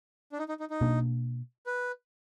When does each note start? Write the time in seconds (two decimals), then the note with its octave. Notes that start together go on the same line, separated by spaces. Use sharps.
0.32 D4
0.39 D#4
0.49 D#4
0.60 D#4
0.70 D#4
0.81 B2 A#3 D4
1.66 B4